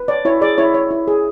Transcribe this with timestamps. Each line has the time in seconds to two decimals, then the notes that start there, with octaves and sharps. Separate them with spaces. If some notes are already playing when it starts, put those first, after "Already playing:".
Already playing: B4
0.08 C#5 D5
0.25 E4 C#5
0.41 G#4 D5
0.58 E4 C#5
0.74 C#5
0.91 E4
1.08 G#4